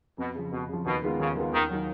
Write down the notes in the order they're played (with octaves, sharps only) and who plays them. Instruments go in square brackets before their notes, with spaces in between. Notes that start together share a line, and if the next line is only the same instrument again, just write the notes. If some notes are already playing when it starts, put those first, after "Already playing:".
[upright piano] F2 [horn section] B2
[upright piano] C#3 F3
[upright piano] F2 [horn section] B2
[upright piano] C#3 F3
[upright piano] D#2 [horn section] B2
[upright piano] D#3 G#3 B3 F4
[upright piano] D#2 [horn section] C#3
[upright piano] D#3 G#3 B3 F4
[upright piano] D#2 [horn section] D#3
[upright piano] D#3 F#3